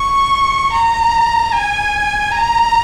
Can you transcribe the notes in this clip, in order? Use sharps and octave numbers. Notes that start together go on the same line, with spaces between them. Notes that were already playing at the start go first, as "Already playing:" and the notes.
Already playing: C#6
A#5
G#5
A#5